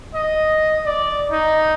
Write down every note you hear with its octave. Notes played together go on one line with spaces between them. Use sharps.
D#5
D5
D#4